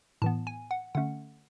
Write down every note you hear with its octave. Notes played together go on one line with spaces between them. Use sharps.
A2 E3 B3 A5
G#5
F#5
D3 A3 C#4 F#5